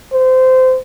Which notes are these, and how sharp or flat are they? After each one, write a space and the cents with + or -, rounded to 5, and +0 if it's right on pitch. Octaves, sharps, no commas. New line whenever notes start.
C5 -20